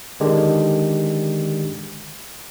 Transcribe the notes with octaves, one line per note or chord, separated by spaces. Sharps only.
D3 D#3 G#3 D4 G4